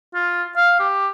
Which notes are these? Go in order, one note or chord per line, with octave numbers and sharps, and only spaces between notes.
F4
F5
G4